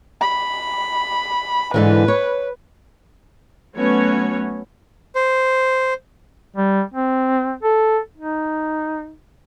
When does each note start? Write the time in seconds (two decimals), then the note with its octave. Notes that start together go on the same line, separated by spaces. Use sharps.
0.21 B5
1.74 G#2 D3 E3 B4
2.08 C#5
3.75 F#3 A3 B3 C#4 F#4 C#5
5.15 C5
6.56 G3
6.94 C4
7.63 A4
8.18 D#4